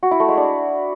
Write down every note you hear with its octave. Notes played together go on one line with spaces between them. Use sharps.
F#4
E4
A3
G#3
D4